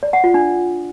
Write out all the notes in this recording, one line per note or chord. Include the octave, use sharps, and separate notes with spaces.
D5
F#5
F4
D4